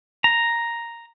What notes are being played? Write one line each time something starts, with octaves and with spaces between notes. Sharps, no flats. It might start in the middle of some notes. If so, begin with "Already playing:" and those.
A#5